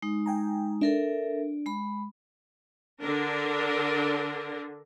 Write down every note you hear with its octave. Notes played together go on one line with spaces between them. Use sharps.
G#3 D#4
G5 G#5 A#5
D4 A4 A#4 E5
G#3 B5
D3 D4 A#4